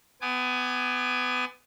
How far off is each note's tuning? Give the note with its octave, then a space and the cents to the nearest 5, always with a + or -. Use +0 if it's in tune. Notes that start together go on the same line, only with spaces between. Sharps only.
B3 +25 G#5 +10 D6 +40